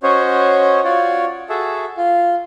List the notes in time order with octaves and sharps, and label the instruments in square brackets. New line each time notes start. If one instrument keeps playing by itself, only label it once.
[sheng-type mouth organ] C#4 F#4 C5 C#5 D#5
F4 F#4 C#5 D5
F#4 G#4 A4 E5
F4